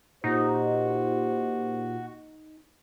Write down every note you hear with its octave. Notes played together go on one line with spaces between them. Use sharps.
A#2 D#4 F#4 G4 C5